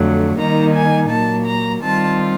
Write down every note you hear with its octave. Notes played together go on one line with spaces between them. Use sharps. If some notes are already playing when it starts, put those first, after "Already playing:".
Already playing: F2 D3 F#3 A3
D#3 G3 A#3 D#4 A#5
G#5
A#2 F#3 A#3 A5
A#5
D#3 G3 C4 F4 A5